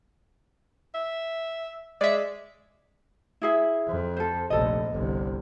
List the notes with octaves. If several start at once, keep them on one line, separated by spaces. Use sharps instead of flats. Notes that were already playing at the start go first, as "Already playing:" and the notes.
E5
G#3 D5 E5
E4 G#4 E5
F2
A4 C5
F1 A#1 A4 D#5
G1 C2